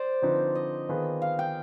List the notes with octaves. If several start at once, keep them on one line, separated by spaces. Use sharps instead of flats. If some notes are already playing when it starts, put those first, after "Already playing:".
Already playing: C5 D5
D3 F3 C4 D#4 B4
D#5
D#3 B3 F4 G#4 B4
F5
G5